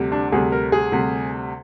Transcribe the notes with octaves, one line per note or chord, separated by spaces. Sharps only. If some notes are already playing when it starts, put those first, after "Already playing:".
Already playing: D2 C3 G3
D4
D2 C3 G3 G#4
A#4
G#4
D2 C3 G3